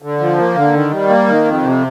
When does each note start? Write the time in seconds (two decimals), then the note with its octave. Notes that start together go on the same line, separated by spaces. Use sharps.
0.02 D3
0.20 F3
0.38 A#3
0.55 D3
0.73 D#3
0.91 G3
1.09 A#3
1.27 D#3
1.45 F2
1.62 C3